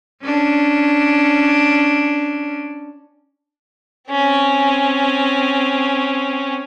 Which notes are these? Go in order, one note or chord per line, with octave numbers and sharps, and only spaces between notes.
C#4 D4
C4 C#4